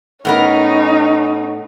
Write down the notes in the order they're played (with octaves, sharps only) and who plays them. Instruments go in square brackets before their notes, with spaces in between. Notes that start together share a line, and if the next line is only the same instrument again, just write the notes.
[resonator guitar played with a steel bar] A2 B3 A#4 [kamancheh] C#4 D#4